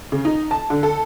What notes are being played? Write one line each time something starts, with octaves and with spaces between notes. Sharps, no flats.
C#3
D#4
A5
D3
A4